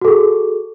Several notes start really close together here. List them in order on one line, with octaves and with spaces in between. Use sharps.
F#4 A4 G#4